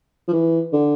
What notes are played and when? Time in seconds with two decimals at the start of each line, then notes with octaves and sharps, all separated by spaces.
0.28 F3
0.33 E3
0.73 D3